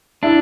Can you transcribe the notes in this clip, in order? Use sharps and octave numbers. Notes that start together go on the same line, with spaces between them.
D4 E4